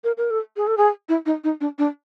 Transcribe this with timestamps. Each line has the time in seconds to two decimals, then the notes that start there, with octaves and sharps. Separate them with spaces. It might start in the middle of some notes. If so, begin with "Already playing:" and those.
0.04 A#4
0.17 A#4
0.30 A4
0.57 G#4
0.67 A4
0.77 G#4
1.09 E4
1.26 D#4
1.44 D#4
1.61 D4
1.78 D4